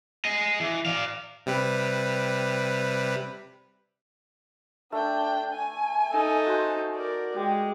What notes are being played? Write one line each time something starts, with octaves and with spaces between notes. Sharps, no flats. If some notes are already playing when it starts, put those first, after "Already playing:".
G#4 D#5
E3
D5 F5
C3 G3 B4
A3 D4 G5
G#5
D#4 A4
F#4 C5
A#4 D5
G#3 G4